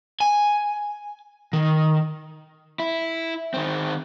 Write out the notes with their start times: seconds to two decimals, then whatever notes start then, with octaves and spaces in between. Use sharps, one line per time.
0.20 G#5
1.53 D#3
2.80 E4
3.54 D#3 C4